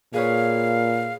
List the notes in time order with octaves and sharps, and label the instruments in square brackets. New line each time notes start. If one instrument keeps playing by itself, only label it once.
[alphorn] A#2 [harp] G#4 B4 C#5 [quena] F5